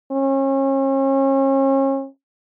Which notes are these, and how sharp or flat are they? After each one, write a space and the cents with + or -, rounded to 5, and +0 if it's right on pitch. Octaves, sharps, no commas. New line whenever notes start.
C#4 -35